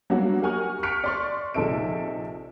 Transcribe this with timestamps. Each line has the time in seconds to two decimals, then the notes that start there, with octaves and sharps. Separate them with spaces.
0.10 F#3 G3 A#3 B3 D4 F#4
0.42 G4 A#4 F#5 G#5 C#6 F6
0.83 C#6 F6 F#6 B6 C#7 D7
1.04 D5 C6 C#6
1.54 A#1 C3 D#4 A4 E5 D7